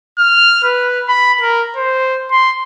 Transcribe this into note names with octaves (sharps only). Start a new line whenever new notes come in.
F6
B4
B5
A#4
C5
C6